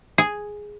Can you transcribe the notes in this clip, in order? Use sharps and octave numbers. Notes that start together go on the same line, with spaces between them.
G#4